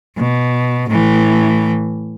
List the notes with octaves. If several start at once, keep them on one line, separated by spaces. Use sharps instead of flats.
B2
A2 E3